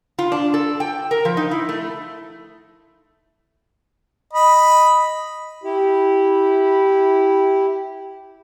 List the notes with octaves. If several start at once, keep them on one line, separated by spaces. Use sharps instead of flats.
F4
D4
A4
G5
A#4
F3
D#4
E4
A3
D#5 B5
E4 G4